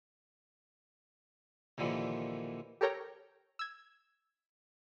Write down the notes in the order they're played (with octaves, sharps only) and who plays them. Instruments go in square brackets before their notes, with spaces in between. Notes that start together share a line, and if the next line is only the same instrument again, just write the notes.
[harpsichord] D#2 A#2 D3 E3 F3
[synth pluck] G4 A4 A#4 C#5 G5 A#5
E6 G#6